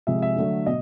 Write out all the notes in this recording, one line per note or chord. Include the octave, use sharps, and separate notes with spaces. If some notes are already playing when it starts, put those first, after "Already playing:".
C3 F3 G#3 E5
E5
D3 F#3 A3
B2 D#5